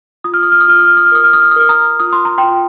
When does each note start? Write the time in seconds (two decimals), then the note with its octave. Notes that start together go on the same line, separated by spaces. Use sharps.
0.24 F4 D#6
0.34 F6
0.43 D#6
0.52 F6
0.60 D#6
0.68 F4 F6
0.79 D#6
0.88 F6
0.97 D#6
1.06 F6
1.12 A#4 D#6
1.24 F6
1.33 D#6
1.42 F6
1.51 D#6
1.56 A#4 F6
1.69 A#5 D#6
1.99 F4 D#6
2.13 C6
2.25 A#5
2.38 G5 C6
2.43 F4